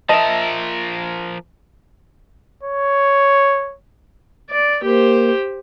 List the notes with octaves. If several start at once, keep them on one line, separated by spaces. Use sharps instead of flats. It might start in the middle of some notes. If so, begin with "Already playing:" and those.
F3 A#4 D#5 E5 A5
C#5
D5
A#3 G4 C5